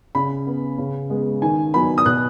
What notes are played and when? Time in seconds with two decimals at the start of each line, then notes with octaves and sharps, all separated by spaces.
0.15 C#3 B5
0.47 B3
0.78 C#3
1.10 G#3 B3
1.42 D#3 G#5
1.74 F#3 B3 B5
1.98 D#6
2.06 B2 F#6